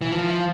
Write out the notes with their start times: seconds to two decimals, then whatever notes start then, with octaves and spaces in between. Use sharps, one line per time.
0.01 E3
0.12 F3